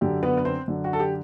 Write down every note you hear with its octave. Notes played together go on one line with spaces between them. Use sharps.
F#2 D3 G4
B3 B4
B4
C4 C5
F#2 D3
F#4
A4
G4